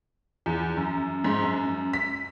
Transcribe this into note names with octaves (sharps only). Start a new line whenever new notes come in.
E2
F#2
G#2
F#2
B6